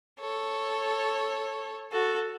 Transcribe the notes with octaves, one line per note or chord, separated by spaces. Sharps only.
A4 C#5
F#4 A4